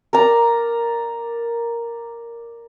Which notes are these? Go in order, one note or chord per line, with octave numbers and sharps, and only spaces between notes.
A#4 D5 A#5